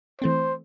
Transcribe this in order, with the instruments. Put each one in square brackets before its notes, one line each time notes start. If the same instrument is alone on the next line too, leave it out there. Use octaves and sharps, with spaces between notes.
[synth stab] E3 A3 C4 [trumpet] C5